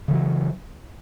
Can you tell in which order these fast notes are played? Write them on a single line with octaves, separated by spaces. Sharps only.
C#3 E3 F#3